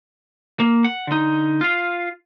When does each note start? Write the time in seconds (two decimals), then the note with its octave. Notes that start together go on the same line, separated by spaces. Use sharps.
0.60 A#3
0.84 F#5
1.07 D3 D#4
1.61 F4 F5